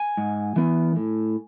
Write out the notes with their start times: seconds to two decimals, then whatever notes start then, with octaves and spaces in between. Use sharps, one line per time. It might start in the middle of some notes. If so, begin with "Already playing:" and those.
Already playing: G#5
0.17 G#2
0.56 E3 B3
0.96 A2